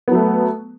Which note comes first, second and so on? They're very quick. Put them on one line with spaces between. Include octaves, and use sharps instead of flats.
B3 F#3 A3